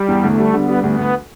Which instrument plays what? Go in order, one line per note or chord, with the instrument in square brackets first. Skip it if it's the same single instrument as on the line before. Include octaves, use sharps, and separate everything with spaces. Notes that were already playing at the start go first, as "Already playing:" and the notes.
Already playing: [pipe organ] G3
[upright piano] E2
[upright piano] D2 [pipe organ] A3
[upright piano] G3
[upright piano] D3 [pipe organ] B3
[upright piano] G3
[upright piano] D2 [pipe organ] B3
[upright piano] D2